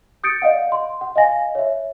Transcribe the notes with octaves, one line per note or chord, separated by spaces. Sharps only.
D#6 G6 A6 C#7 D7
D5 D#5 F5 F#5
C6
F#5
D#5 F5 G#5 A#6
C#5 E5